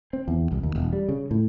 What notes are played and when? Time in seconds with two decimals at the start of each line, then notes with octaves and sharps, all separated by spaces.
0.13 C4
0.28 E2
0.52 C2
0.63 D#2
0.76 E1
0.93 G3
1.09 C#3
1.31 A2